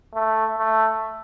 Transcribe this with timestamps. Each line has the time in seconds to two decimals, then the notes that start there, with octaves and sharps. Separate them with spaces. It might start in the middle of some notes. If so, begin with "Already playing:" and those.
0.14 A3
0.58 A3